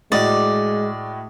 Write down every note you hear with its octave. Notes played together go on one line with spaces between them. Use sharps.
A2 G#3 F#4 D5 D#5